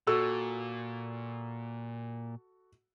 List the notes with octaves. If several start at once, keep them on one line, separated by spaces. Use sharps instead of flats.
A#2 F#4 A4 E6